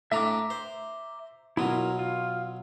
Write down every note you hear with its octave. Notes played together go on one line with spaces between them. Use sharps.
A2 D4 E5 A#5 D6
C5
B2 F#3 E4 F4 A#4
F4